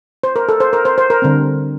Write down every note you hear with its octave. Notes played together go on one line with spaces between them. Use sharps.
C5
A#4
A4
C5
A#4
C5
C5
A#4
D3 G3 C4